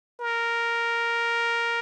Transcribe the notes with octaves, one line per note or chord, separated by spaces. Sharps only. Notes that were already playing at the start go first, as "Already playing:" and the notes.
A#4